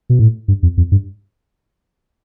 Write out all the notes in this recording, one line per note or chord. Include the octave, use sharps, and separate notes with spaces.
B2
A2
G2
F2
F2
G2